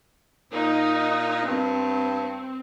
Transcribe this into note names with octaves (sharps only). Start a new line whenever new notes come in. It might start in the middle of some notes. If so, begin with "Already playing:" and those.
A#2 D#4
G2 C4